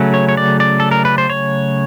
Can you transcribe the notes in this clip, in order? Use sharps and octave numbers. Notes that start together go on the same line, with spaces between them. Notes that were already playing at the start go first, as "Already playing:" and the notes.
Already playing: C#3 F#3 A3 C#4
C#5
C#5
D5
D5
A4
A#4
B4
C5
C#5